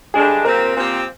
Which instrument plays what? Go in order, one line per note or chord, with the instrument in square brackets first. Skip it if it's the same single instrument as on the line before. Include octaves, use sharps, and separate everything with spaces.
[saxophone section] G2 D3 G#3 D4 [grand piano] G#4
[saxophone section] A#2 F3 C4 G4 [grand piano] A#4
[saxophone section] A#2 F3 C4 G4